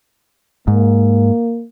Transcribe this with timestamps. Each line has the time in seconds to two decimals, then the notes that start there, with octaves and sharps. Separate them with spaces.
0.68 G#2 A#3